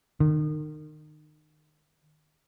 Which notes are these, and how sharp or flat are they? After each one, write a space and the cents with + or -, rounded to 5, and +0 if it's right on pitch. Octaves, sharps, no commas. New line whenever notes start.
D#3 -30